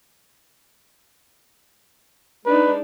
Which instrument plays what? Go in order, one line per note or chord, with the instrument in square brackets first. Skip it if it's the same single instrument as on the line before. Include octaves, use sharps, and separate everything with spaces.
[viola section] G#3 D4 D#4 [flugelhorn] B4